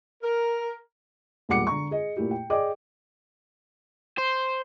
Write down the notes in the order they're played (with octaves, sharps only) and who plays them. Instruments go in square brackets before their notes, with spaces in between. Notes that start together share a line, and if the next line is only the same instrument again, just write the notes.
[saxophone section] A#4
[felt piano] E1 A#2 G3 F#5 D6 C#7
D3 A#5 C#6
G#4 D#5
A#2 A3 E4 G4
G5
G#4 D5 D#5 G5 D6
[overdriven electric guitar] C5